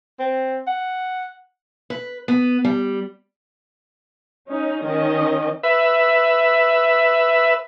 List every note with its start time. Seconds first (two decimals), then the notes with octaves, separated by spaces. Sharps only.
0.19 C4
0.67 F#5
1.90 B4
2.28 B3
2.64 G3
4.47 C#4 D#4
4.84 D#3 C#4 D#5
5.63 B4 E5